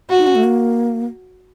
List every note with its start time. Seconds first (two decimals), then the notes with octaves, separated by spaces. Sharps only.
0.10 F#4
0.18 D#4
0.27 C#4
0.35 A3
0.44 A#3